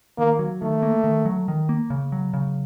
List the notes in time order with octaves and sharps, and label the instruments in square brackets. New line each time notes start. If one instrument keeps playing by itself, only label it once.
[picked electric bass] D#3 [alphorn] A#3
[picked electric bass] F#3
[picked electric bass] D#3 [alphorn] A3
[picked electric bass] A#3
D#3
F#3
D#3
A#3
C#3
F#3
C#3